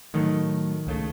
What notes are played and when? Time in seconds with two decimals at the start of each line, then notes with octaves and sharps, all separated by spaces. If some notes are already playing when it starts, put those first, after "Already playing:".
0.14 A2 D#3 F#3 A3
0.87 C#2 C#3 A3